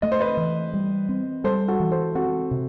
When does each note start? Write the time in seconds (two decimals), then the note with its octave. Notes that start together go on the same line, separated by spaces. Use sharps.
0.02 A3 D#5
0.12 C5
0.20 B4 D#5
0.37 E3
0.74 G3
1.09 C4
1.44 G3 A4 C5
1.68 F#4 A4
1.80 E3
1.91 A4 C5
2.15 C4 F#4 A4
2.51 C3